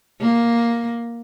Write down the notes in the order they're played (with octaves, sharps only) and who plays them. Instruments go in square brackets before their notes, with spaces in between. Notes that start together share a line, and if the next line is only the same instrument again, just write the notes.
[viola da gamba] A#3